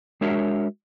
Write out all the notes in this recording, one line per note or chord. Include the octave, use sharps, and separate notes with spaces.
G#3 D4 F#4 A#4 C#5 E5